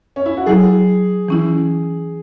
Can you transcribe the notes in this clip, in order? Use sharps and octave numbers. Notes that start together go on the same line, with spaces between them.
C#4
E4
F#4
F#3 E4 G#4
E3 C#4 E4